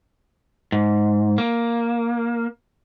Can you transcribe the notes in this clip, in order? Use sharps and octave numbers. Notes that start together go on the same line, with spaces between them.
G#2
A#3